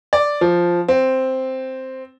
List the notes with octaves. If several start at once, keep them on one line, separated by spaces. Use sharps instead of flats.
D5
F3
C4